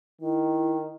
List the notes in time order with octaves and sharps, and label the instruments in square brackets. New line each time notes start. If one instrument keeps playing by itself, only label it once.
[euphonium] D#3 [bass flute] E4